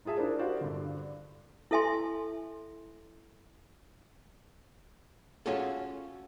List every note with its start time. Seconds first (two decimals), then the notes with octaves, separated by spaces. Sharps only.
0.05 D#4 F4 G#4 E5 A5
0.17 D4 E4 F4 A#4 C5 D5
0.39 F#4 G4 A#4 C5 D5 F5
0.61 G2 D3
1.71 E4 A4 E5 G#5 C6
5.46 C#4 F4 F#4 G#4 A4